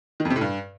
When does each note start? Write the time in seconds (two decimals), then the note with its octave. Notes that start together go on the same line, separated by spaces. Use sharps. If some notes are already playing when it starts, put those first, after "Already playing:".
0.20 D#3
0.25 F2
0.30 C3
0.36 A2
0.41 G2